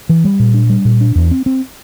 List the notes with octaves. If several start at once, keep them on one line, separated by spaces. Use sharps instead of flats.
E3
G3
A#2
D4
G3
A#2
D4
E2
C4
C4